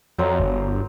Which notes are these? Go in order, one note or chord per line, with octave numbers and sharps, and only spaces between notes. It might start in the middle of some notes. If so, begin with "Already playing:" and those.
F2 F#3 C5 A#5
G1